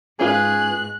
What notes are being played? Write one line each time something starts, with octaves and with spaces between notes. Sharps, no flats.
G#2 C#4 F4 G#4 B4 F#6